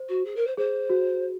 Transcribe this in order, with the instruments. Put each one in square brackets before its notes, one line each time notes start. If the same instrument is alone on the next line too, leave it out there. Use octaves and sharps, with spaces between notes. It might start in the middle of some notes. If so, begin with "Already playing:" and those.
Already playing: [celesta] C5
[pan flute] F#4
G#4
A#4
C5
[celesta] G#4 [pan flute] C5
[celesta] F#4